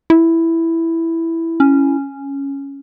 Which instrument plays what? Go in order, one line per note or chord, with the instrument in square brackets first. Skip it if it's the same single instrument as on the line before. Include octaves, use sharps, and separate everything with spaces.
[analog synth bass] E4
[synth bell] C#4